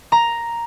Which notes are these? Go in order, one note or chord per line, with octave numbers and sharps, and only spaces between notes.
A#5